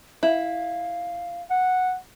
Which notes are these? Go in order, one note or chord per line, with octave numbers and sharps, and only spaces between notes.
E4 F5
F#5